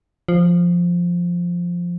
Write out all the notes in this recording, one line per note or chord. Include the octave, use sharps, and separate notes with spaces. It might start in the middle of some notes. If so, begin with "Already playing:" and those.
F3